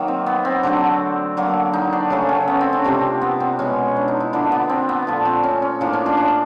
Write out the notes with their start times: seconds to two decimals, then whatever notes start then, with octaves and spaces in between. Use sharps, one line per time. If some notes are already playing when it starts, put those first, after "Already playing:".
Already playing: D#3 F#3 A#3
0.08 C4
0.26 B3
0.45 C4
0.63 D3 F#3 A3 D4
1.37 D3 F#3 A#3
1.73 D#4
1.93 D4
2.10 C#3 F#3 A3 C#4
2.29 C#4
2.47 B3
2.61 C4
2.73 D4
2.84 C3 F3 A#3 C4
3.21 B3
3.40 C4
3.59 B2 G#3 B3 C#4
3.96 D4
4.08 D#4
4.20 E4
4.33 D3 F3 A#3 D4
4.52 B3
4.69 C4
4.89 B3
5.07 A#2 F3 A3
5.25 C4
5.44 C#4
5.62 C#4
5.81 A2 F3 A#3 D4
5.93 C#4
6.06 D4
6.17 D4